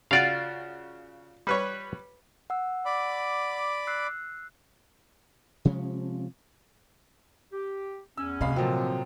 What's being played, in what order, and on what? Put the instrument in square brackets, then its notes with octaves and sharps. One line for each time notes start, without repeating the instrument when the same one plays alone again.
[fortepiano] C#3 F#4 [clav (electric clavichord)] F4 D5 F5
[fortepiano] G3 B4 C#5
[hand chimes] F#5 E6
[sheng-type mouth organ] D5 B5 D6
[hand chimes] E6 F#6 C7
[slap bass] C3 F3 G#3 C#4
[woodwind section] G4
[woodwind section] E2 C#4 [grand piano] E6
[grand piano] D1 F5 B5 [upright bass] C3 [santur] D#5
[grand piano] A#2 F#3 [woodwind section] D3 F3 [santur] C4